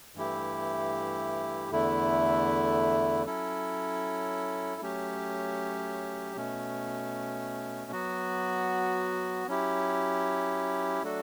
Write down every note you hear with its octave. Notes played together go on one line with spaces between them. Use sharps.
G2 E3 A3 E4 G4
E2 D3 A3 E4
F#3 C#4 E4 A4
F#3 A3 C#4 G4
B2 A3 C#4
F#3 B3 F#4
F#3 C#4 E4 G4
F#3 A3 D4 F#4 A4